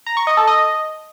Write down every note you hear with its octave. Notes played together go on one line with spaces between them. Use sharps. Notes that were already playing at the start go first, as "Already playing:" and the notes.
A#5
C#6
D#5
A4
D#5